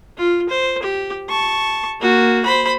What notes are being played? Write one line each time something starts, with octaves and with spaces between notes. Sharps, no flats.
F4
C5
G4
A5 C#6
A#3 F#4
C5 B5